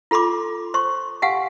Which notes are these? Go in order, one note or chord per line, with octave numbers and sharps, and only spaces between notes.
F4 A4 B5 C6 D6
C5 C6 C#6
G4 F5 F#5 G#5